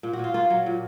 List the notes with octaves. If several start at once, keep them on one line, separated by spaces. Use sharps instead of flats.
A#2
F#4
A#2 F4
A#3 F4
F#3
A#2